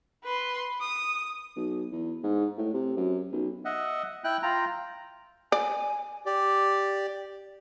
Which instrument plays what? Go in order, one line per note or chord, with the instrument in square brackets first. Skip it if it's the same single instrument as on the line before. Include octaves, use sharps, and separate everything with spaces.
[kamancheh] B4 C6
D#6
[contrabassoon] B1
E2
G#2
A2
C3
F#2
B1
[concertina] D#5 E5 F#5
E4 G5 F#6
F4 G5 A#5
[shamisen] D5 [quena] G#5
[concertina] G4 D5